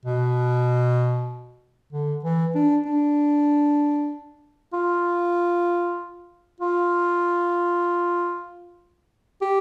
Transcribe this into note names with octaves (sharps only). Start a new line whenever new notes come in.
B2
D3
E3
D4
D4
F4
F4
G4